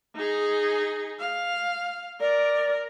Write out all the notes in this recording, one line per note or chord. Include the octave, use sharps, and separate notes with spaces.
D#4 G#4
F5
A#4 D5